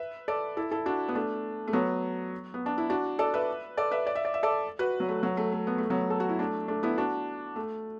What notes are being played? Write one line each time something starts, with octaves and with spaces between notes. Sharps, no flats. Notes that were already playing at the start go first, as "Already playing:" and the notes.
Already playing: B4 E5
A4 D5
E4 A4
E4 A4
D4 F#4
B3
A3 D4
A3
F#3 B3
B3
D4
E4
D4 F#4
A4 D5
B4 E5
A4 D5
B4 E5
D5
E5
D5
E5
A4 D5
F#4 B4
F#3
A3
F#3
A3
A3
B3
A3
F#3 B3
A4
F#4
E4
A3 D4
A3 D4
B3 E4
D4 F#4
A3